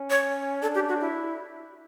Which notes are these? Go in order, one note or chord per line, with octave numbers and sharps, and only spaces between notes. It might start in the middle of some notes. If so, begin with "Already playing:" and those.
Already playing: C#4
C#5
D4 A4
G4
F#4
E4